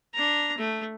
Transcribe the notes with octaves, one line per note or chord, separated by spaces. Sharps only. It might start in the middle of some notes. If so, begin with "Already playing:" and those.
D4 A#5
A3